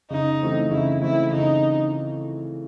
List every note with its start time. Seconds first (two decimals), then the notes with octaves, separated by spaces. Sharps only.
0.10 C#3 D#4
0.42 E3 A3 C4
0.71 C#3 E4
1.02 E3 A3 C4 E4
1.32 C#3 D#4